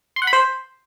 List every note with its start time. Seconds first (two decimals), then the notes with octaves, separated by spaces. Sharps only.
0.16 C6
0.22 F#5
0.27 B5
0.33 C5